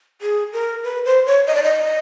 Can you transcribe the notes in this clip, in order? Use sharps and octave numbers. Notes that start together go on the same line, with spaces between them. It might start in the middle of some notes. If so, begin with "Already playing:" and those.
G#4
A#4
B4
C5
C#5
D#5
D5
D#5